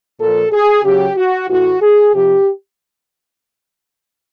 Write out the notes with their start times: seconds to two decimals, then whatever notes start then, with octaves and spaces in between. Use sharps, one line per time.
0.20 A#2 F3 A4
0.53 G#4
0.85 C#3 F#3 G4
1.17 F#4
1.49 A2 E3 F#4
1.82 G#4
2.14 C3 F3 G4